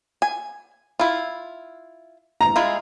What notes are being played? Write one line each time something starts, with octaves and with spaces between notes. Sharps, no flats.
G#5
E4 F4
A#5
G#3 E4 F4